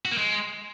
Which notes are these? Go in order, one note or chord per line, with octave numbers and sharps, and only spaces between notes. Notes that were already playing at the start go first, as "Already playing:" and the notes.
F#4
A#3
G#3